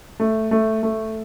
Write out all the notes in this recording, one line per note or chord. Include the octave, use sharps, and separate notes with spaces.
A3
A3
A3